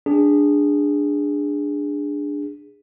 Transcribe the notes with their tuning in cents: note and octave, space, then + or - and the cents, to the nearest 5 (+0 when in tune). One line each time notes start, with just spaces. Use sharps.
D4 +0 G#4 -15